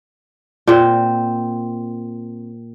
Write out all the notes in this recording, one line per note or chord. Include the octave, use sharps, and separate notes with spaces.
A#2 C4